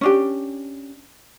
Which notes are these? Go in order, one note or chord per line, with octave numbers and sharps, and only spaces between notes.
C#4 D4 G4